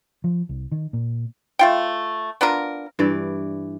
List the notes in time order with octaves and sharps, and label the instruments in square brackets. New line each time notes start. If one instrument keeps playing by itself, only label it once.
[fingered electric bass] F3
C2
D#3
A#2
[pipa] A3 F4 G5
B3 D4 F4 A#4
[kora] G2 E3 D5